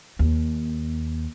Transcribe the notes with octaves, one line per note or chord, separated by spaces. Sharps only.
D#2